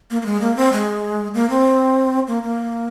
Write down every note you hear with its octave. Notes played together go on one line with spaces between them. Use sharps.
A#3
A#3
G#3
A#3
C4
G#3
A#3
C4
A#3
A#3